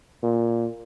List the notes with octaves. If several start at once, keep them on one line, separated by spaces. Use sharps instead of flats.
A#2